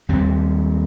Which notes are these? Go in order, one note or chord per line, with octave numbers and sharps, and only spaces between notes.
D#2 G3 C4